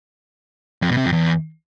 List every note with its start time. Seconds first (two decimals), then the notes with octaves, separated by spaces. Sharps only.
0.82 F2
0.90 B2
0.97 C3
1.05 F2
1.13 E2